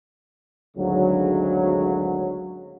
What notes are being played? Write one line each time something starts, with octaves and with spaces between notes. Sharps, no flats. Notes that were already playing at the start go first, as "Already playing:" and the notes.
G#1 D2 C#3 F#3